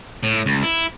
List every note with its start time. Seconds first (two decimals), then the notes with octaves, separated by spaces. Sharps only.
0.23 A2
0.46 C#2
0.63 E4